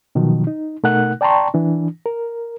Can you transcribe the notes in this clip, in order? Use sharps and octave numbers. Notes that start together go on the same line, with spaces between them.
B2 D#3 F3 F#3
D#4
B2 A3 D#4 A#4 F#5 F#6
D5 G5 A5 A#5 C6 C#6
E3 D4
A#4